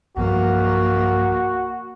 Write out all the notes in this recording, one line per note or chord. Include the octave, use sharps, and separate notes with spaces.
B1 G2 F3 A#3 F#4